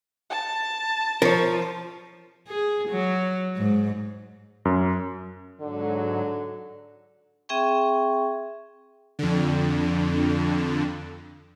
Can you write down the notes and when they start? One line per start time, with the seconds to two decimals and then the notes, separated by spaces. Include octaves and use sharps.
0.30 A5
1.22 F3 A#4 C#5
2.48 G#4
2.89 F#3
3.57 G#2
4.65 F#2
5.61 G#2 D3 F#3
7.49 C4 G#4 E5 G5 C#6
9.19 F2 D3